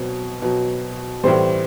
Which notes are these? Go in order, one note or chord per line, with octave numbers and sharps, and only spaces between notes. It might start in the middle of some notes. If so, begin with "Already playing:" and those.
Already playing: B2 F#3 C4
B2 F#3
A2 E3 G3 C4 C5